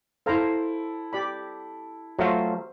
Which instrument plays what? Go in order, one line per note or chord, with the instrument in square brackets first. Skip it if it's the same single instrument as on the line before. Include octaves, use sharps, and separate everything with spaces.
[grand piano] E4 A4 [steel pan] C5 F5 A#5
[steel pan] G4 D5 B5
[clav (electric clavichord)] F#3 A3 F4 [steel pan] F#4 C5 E5